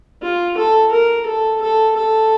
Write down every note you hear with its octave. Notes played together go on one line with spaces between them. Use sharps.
F4
A4
A#4
A4
A4
A4